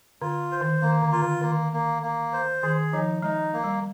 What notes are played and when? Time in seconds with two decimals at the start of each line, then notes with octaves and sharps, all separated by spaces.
0.21 D3 F4
0.52 C5
0.61 D#3
0.82 D#3 A#3
1.02 D3
1.12 F4
1.22 D3
1.41 D#3 A#3
1.73 A#3
2.02 A#3
2.33 C5
2.63 D#3 G#4
2.93 F3 D#4
3.22 G#3 D#4
3.53 A#3
3.64 G3